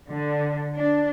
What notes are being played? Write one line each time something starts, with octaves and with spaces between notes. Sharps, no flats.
D3
D4